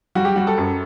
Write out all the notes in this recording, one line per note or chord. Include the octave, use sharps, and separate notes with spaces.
G3 F#4
G4
G3 F#4
A4
F#2